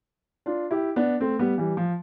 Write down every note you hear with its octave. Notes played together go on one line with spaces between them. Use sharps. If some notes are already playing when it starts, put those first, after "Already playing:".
D4 F4
E4 G4
B3 D4
A3 C4
G3 B3
E3 G3
F3